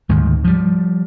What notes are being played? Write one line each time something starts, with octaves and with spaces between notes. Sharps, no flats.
D2 G#2 D#3
F3 G3